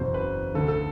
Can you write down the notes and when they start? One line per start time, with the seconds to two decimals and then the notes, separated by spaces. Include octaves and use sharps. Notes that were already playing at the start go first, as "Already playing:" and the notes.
Already playing: F#1 E2 B2 C5
0.14 B4
0.54 D2 D3 A4
0.68 A4